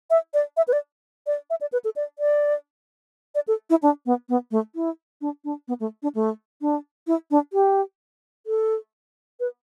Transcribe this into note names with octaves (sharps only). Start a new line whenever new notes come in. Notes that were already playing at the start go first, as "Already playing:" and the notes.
E5
D5
E5
B4
D5
D5
E5
D5
B4
A4
D5
D5
D5
A4
E4
D4
B3
B3
A3
E4
D4
D4
B3
A3
D4
A3
D4
E4
D4
G4
A4
B4